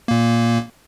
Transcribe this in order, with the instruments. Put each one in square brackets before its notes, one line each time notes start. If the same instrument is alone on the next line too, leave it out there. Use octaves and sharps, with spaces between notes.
[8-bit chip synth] A#2 A#3